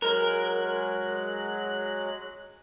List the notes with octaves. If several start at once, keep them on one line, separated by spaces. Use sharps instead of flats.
F#3 G#3 A#4 F#6